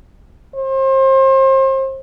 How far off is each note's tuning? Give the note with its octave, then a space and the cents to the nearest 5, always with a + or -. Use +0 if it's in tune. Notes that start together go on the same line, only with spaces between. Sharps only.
C5 +35